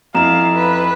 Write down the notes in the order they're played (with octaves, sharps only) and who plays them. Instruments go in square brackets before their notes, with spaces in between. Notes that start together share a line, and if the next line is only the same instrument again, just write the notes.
[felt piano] F2 E4 [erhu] F5 [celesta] A#5 E7
[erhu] B4